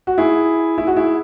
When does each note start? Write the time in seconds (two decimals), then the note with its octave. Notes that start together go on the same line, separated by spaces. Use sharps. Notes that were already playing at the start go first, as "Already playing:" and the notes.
0.07 F#4
0.18 E4 G#4
0.78 E4
0.87 F#4
0.97 E4 G#4